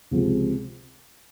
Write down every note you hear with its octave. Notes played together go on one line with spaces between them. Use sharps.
C#2 C3 F3 G#3